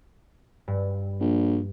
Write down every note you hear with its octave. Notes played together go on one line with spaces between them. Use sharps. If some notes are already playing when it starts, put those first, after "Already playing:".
G2
A#1